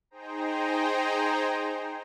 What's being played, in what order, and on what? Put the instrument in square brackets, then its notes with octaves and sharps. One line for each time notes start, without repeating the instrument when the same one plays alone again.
[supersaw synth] D#4 G#4 C5 G5 A#5